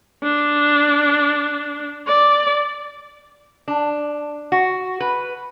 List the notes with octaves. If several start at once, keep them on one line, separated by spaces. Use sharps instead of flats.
D4
D5
D4
F#4
B4